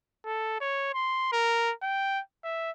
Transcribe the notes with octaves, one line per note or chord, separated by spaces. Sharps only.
A4
C#5
C6
A#4
G5
E5